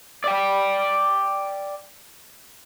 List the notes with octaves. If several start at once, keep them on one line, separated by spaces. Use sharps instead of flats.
D5 G5